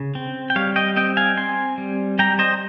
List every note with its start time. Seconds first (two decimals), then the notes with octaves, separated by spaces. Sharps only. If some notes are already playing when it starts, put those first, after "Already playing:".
Already playing: C#3
0.15 C4
0.50 G5
0.56 G3 C#5 F5
0.76 D#5 G5
0.96 C4 D#5 G5
1.17 F5 G#5
1.37 C4 G#5 C6
1.78 G3
2.19 G3 G5 A#5
2.39 C5 D#5